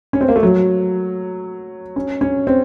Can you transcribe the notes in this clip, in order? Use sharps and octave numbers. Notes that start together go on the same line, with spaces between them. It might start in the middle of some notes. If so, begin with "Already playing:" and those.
C#4
C4
A#3
A3
F#3
C#4
C#4
C4